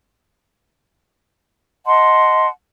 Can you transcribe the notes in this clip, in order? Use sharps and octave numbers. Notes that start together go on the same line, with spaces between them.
D#5 F#5 A5 C6